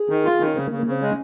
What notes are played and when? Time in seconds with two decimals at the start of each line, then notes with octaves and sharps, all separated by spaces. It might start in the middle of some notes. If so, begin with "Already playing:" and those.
Already playing: G#4
0.09 D#3
0.25 F4
0.40 D#3
0.47 C#4
0.55 C#3 C4
0.67 A#3
0.71 C#3
0.78 A#3
0.86 C#3 C4
1.02 G#3 C#4